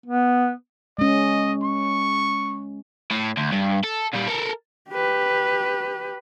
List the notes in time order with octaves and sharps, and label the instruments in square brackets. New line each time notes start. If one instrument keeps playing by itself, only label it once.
[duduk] B3
[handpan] G#3 C#4 [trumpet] D#5
[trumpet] C#6
[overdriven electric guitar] A2
D2
G2
A4
A#2 G3
A4 A#4
[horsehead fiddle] G4 B4